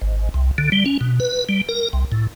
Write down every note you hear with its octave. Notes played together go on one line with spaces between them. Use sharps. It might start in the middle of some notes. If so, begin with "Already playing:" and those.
G#1
C2
D3
G3
C#4
B2
B4
G3
A#4
C2
A2